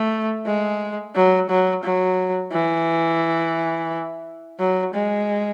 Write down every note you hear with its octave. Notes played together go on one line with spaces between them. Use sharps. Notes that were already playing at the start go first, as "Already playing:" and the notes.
Already playing: A3
G#3
F#3
F#3
F#3
E3
F#3
G#3